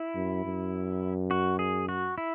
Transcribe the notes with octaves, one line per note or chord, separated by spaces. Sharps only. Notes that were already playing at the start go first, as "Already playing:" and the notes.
Already playing: E4
F#2
F#2
F#4
G#4
F#4
E4